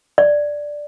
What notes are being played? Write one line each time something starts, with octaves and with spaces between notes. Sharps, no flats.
D5